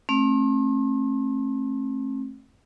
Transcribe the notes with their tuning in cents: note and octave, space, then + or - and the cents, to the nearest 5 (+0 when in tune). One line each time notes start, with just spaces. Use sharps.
A3 +0 C4 +45